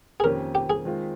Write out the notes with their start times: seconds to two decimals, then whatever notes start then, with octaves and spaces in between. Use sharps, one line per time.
0.20 G#4
0.24 F2 D#3 A#3 C#4 G4 A#4
0.55 G4
0.70 G#4
0.85 D#3 G#3 C4 F4